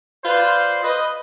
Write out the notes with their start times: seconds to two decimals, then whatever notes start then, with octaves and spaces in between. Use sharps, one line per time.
0.24 F4 B4 C5 D5
0.82 B4 D#5